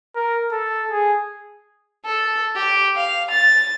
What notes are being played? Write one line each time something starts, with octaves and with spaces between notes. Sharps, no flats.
A#4
A4
G#4
A4
G4
F5
A6